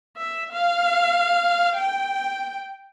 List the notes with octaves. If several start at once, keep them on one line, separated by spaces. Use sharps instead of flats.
E5
F5
G5